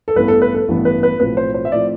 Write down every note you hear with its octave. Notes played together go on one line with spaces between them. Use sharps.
A4
A1 G2 E3 B3 B4
A4
B4
A4
A1 G2 E3 B3
B4
B4
B1 A2 F3 C4 B4
C5
C5
E5
A2 F3 C4 D5